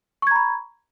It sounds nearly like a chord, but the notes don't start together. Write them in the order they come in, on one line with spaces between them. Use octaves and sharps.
C#6 G#6 A#5 B5